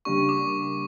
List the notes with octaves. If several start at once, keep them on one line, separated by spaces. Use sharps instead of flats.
C#3 G3 A#3 D4 G4 C#6
D6